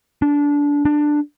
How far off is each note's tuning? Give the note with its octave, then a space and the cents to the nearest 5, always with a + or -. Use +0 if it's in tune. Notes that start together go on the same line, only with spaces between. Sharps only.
D4 -20
D4 +10